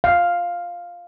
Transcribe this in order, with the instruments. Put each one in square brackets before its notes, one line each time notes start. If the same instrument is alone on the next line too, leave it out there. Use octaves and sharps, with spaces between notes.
[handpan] F5